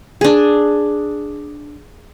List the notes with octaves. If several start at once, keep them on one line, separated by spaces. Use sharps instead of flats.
D4 G#4